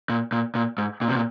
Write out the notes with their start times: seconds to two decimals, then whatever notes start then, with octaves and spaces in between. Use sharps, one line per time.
0.09 A#2
0.32 A#2
0.55 A#2
0.78 G#2
1.01 A#2
1.09 C3
1.15 A#2